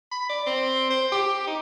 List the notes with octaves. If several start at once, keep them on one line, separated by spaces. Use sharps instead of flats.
B5
D5
C4
C5
G4
D#4